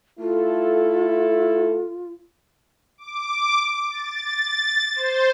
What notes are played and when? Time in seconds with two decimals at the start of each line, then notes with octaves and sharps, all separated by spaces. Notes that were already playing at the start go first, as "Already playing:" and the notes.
0.19 A3 E4 F4 A4
2.98 D6
3.90 A6
4.95 C5